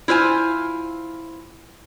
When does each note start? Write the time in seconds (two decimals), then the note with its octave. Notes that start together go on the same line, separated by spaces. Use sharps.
0.08 E4 F4 C5 G#5